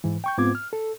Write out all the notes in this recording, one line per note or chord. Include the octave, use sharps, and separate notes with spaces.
G#2 E3
G5 C#6 G6
G#2 B3 C4 F4 D6 G#6
F6
A4